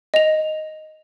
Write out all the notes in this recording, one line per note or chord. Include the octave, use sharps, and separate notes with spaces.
D#5 F7